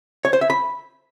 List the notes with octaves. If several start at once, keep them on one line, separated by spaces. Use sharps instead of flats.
C#5
C5
E5
B5